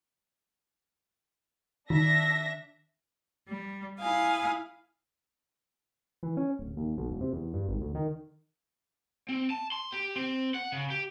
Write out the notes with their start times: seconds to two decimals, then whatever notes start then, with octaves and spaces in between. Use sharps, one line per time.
1.90 D#3 D4 E5 A#6
3.47 G3
3.99 E4 F5 G#5 D#6
6.23 E3
6.37 C#4
6.59 D1
6.77 D#2
6.97 B1
7.09 E1
7.21 C3
7.33 E2
7.54 G2
7.68 G#1
7.81 D2
7.95 D#3
9.29 C4
9.50 A5
9.72 C6
9.92 G4
10.16 C4
10.54 F#5
10.72 C#3
10.90 G4